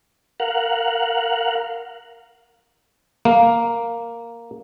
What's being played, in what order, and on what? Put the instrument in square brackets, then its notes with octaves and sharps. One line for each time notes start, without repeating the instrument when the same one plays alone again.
[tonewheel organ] A#4 F5 F#5
[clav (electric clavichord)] A#3